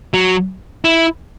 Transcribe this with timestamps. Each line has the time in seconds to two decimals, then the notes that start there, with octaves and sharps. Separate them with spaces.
0.14 F#3
0.84 E4